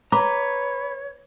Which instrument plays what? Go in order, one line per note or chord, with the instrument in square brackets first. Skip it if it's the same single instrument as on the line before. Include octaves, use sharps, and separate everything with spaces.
[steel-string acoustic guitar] B4 [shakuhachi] C#5 [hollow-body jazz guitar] A#5 [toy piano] B5 D6